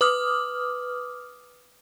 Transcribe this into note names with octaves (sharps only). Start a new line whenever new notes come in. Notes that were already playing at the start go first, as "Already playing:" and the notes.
B4 D6 D#6 F6